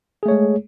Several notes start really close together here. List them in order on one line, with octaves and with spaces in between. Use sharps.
G#4 A3 C#5 G#3